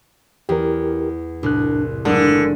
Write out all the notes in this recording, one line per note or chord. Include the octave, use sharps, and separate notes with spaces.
E2 G4 A#4
C2 A2 D4 F#6
F#1 D3 G#3 A3 A#4